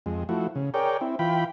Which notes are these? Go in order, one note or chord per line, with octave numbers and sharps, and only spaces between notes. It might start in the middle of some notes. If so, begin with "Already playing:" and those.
F2 G#3
F3 A3 E4 F#4
C#3
G#4 A#4 C#5 D5 G5
C4 E4
E3 F4 G5 B5